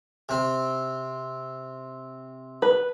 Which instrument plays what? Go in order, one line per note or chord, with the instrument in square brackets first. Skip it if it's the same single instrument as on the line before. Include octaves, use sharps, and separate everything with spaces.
[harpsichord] C3 C4
[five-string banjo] B4